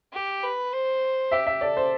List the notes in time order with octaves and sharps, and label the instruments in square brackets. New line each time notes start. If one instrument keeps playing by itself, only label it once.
[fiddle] G4
B4
C5
[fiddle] G4 [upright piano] E5
[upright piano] E5
[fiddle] A4 [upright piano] D5
[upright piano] C5